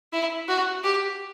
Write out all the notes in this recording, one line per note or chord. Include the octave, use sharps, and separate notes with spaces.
E4
F#4
G4